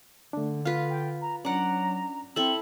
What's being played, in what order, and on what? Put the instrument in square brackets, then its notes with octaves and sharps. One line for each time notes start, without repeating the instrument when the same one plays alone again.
[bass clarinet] D3 [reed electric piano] A3 D4
[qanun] F4 B4 [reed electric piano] F5
[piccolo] G5
A#5
[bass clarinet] F#3 [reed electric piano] C#4 D4 [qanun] D5 F#5 [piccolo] A#5
[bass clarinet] C4 [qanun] E4 A4 [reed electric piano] E6 [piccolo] F#7